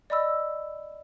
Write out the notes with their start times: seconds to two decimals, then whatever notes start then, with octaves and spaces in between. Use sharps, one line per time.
0.10 D5 D#5 B5 E6